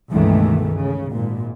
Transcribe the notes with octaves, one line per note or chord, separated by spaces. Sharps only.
C#2 G2 B2 D#3 E3 A3
C#3
G#1 A#2